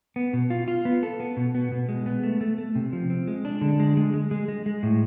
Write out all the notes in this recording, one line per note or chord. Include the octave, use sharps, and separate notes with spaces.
B3
B2
F4
F4
B3
A4
B3
B2
B3
B2
G#3
B3
A3
A3
A3
C3
F3
C4
G#3
D4
D3
G#3
G#3
G#3
G#3
G#3
G#3
A2